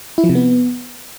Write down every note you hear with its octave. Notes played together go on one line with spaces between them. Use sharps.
E4
F3
C3
B3